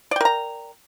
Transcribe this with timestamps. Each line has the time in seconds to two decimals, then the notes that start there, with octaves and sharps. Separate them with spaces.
0.11 D5
0.16 G5
0.21 A#4
0.25 A#5